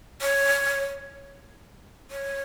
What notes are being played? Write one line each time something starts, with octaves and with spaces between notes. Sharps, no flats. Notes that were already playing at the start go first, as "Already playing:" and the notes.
C#5
C#5